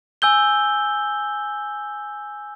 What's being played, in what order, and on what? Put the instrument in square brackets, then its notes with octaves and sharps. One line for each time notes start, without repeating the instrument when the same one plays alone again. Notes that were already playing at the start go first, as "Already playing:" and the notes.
[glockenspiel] G#5 E6 G6 G7